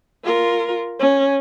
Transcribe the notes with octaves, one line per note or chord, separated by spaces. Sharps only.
F4 A#4
C#4